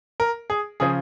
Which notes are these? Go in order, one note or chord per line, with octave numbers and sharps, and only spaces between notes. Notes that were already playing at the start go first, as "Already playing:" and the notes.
A#4
G#4
C#3 F3 G#4